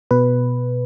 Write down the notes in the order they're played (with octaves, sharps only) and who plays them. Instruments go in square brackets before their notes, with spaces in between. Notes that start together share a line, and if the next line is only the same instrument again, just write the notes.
[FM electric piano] B2 B4